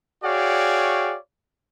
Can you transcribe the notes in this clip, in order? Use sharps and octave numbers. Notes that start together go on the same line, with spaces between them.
F#4 G#4 C#5 D5 F5 G5